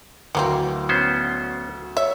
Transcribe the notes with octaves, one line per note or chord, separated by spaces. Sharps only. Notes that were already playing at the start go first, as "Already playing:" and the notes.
D2 E3 F#3 A#3 C4
B3 C#4 C5
C#5 E5